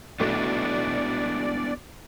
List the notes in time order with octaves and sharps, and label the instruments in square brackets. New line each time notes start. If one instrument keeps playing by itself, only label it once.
[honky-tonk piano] B1 A3 [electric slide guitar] B3 D4 E4 [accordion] D5